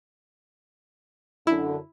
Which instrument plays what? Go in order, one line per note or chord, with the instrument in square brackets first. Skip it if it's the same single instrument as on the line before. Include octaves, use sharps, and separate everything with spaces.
[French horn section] F#2 D3 [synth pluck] E4